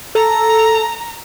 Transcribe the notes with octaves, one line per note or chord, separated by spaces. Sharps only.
A4 A#5